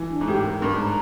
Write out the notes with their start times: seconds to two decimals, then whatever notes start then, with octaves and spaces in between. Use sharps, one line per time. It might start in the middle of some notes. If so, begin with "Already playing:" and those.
Already playing: E3
0.10 D4
0.21 G#2
0.27 A2 G4
0.45 A#4
0.62 G2 A#4
0.74 G#2
0.79 A#5